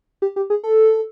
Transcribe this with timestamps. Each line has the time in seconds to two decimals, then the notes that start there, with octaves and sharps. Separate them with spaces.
0.22 G4
0.36 G4
0.50 G#4
0.63 A4